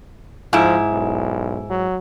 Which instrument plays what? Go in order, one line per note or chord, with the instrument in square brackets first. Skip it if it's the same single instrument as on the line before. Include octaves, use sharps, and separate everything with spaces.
[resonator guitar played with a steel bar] G#2 E4 [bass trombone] F3
[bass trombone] B1
F#3